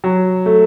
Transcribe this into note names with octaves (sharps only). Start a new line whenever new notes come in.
F#3
A3